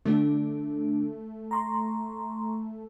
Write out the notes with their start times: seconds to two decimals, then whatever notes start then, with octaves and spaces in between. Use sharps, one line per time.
0.05 D3 A3 D4
1.51 A#5 C6 C#6